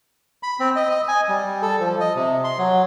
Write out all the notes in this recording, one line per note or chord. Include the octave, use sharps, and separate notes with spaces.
B5
C4
D#5
D#5
G#5
G3
A4
F3
D#5
C3
C6
F#3